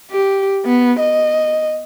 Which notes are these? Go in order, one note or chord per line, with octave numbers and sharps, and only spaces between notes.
G4
B3
D#5